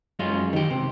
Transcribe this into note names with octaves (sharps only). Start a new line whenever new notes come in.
F#2 G#3 C#4 F4
D#3 G4
C3